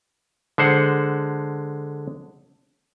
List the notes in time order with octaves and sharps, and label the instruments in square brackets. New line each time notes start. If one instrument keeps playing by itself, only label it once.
[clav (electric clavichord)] D3 G#3 C5 F#5